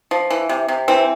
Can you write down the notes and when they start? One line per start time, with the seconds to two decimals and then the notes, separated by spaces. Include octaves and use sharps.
0.11 F3
0.30 E3
0.49 C3
0.68 C3
0.88 E3 C4